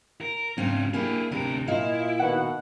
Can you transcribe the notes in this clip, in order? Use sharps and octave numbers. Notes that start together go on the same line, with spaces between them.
A#4
G#2 C#3 C4 D4 F4
A#3 D4 E4 G4 G#4
D2 C3 D4 A#4
A#2 E4 F4 D#5 F5
B2 D#3 F#5